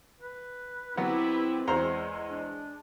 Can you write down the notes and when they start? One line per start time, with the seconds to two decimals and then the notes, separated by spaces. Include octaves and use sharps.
0.21 B4
0.97 F#3 B3 C4 E4 G4 B4
1.68 E2 G#3 C5 A#5
2.30 D4